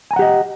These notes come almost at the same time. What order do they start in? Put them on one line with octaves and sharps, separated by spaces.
G#5 A#5 F#5 G4 D#5